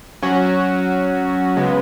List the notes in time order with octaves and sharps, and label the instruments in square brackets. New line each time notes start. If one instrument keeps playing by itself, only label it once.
[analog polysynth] F#3 C#4 F#4
C#3 G#3 B3